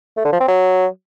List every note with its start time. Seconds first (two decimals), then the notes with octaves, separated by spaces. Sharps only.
0.17 A3
0.25 D3
0.33 F3
0.40 C4
0.48 F#3